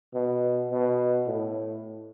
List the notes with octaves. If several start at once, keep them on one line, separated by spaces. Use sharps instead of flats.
B2
B2
A2